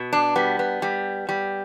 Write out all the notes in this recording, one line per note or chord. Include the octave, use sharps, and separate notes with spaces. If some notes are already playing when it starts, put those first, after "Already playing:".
Already playing: B2
D4
G3 B3
B3
G3
G3